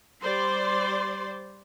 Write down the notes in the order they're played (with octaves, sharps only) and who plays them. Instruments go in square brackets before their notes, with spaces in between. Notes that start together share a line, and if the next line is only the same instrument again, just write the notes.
[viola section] G3 C5 D5 C6